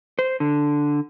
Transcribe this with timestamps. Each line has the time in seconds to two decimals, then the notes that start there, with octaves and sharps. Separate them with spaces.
0.19 C5
0.40 D3